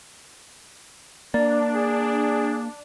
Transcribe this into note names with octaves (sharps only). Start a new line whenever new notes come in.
A#3 D4 D5
G#4